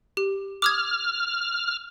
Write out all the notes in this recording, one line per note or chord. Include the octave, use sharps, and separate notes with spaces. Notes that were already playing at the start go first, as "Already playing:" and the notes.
G4
D6 D#6 F6 G#6